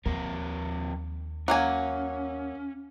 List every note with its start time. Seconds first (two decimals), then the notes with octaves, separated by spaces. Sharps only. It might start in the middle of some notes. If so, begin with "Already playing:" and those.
0.06 D#2 F3 C4 A#4
1.48 F#3 A#3 C#4 G#5